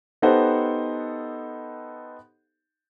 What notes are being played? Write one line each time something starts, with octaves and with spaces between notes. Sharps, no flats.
B3 D#4 G4 A4 C5 F#5